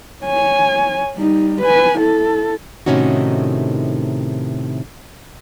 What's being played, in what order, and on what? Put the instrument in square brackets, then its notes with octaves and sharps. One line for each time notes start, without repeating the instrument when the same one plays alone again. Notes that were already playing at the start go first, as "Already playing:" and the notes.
[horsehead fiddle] C#5 G#5
G3 D#4
B4 G#5
E4 A4
[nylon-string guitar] A2 C3 D#3 C#4 D#4 F#4